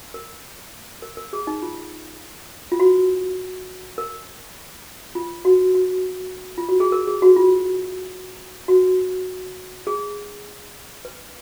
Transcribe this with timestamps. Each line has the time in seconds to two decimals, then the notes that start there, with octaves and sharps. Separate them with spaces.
0.14 A#4
1.02 A#4
1.17 A#4
1.33 G#4
1.47 D#4
1.62 F4
2.72 F4
2.80 F#4
3.98 A#4
5.15 F4
5.45 F#4
5.75 F#4
6.58 F4
6.69 F#4
6.80 G#4
6.92 A#4
7.07 G#4
7.22 F#4
7.36 F4
8.68 F#4
9.87 G#4
11.05 B4